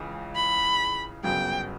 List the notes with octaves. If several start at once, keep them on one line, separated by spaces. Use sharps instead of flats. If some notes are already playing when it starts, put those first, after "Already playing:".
Already playing: C#2 C#3 E3
B5
G1 F#2 C#3 F#3 B3 G5